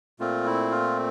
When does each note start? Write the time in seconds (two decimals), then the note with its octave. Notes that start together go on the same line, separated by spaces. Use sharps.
0.20 A#2 A3 C4 F4
0.46 E4
0.71 F4